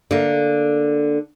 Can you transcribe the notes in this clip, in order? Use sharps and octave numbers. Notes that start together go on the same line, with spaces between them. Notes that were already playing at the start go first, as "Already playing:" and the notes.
D3 A#3